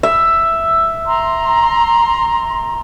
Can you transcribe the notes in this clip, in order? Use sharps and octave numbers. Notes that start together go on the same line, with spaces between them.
E5
A#5 C6